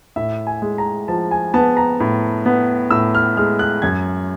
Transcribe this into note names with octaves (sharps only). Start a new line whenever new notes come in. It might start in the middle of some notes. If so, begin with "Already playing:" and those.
A2 E5
G#5
G#3
A#5
F3 A5
G#5
B3 A5
A#5
A2
B3
A2 E6
F6
G#3 F6
F#6
F#2 G#6